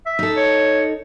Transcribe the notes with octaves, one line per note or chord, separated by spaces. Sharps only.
E5
D#4 A4
C#5